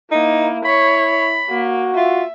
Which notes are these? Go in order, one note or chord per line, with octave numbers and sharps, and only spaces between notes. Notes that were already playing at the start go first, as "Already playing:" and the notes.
A#3 D#4 E4
C#5 B5
A#3 F#4
F4 E5